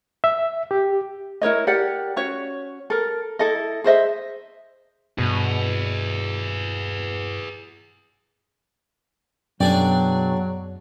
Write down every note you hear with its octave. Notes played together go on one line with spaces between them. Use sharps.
E5
G4
E4 A#4 C#5 D#5
G4 A#4 D5 F#5
C#4 F#4 C#5
A4 A#4
E4 A4 D#5
G#4 C5 D#5 E5
G2 B2 G#4 B4
F#2 B2 F#3 D4 G#4 D5 G5